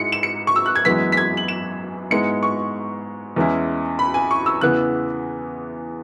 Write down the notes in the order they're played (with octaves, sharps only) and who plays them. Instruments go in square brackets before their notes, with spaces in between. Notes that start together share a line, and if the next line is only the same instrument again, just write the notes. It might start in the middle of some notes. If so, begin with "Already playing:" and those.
Already playing: [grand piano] G#2 G#3 E4 [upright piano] C#7
[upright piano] E7
C#7
C#6
E6
F#6
G#6
[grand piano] F#2 E3 G#3 B3 [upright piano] B6
[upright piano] B6
G#6
F#7
E7
[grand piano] G#2 G#3 B3 E4 [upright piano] C#7
[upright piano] C#6
[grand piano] E2 E3 G#3 C#4 E4
[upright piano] B5
G#5
C#6
E6
[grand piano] E2 C#3 E3 B3 [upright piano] F#6